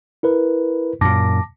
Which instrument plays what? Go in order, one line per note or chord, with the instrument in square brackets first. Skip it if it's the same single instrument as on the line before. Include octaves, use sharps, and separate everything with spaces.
[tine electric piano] E4 A#4 B4
[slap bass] F#2 A#2 [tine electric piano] A5 D6 A#6